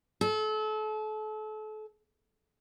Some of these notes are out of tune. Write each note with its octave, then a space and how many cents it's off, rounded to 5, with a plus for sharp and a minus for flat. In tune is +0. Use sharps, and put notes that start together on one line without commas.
A4 -35